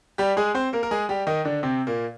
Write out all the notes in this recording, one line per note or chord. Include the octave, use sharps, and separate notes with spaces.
G3 G4
G#3 G#4
C4 C5
A#3 A#4
A#4
G#3 G#4
G3 G4
D#3 D#4
D3 D4
C3 C4
A#2 A#3